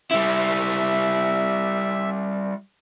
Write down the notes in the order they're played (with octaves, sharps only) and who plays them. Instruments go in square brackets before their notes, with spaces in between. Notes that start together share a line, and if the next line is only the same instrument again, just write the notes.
[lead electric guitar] G3 E4 [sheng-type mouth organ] E5